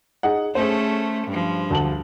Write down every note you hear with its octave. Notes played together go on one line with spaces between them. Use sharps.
D#4 G#4 F#5
A3 C#4 G#4 A4 C5
G2 F3
D2 A5 F#7